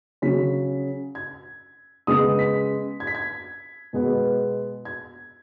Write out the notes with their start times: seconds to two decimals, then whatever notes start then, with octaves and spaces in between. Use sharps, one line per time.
0.22 C#3 F#3 C#4 B6
1.15 G#6
2.07 C#3 G#3 B3 D#6
2.39 B6
3.00 G#6
3.07 B6
3.15 G#6
3.93 B2 G#3 B3
4.85 G#6